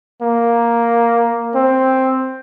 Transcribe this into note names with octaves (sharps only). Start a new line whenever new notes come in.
A#3
C4